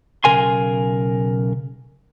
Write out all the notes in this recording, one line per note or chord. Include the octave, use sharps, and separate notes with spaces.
B1 G2 C#3 A#4 G#5 C6